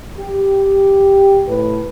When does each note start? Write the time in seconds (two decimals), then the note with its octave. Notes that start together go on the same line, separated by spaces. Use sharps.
0.18 G4
1.47 A2 B4